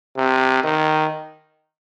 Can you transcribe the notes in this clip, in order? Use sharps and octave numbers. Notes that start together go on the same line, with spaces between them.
C3
D#3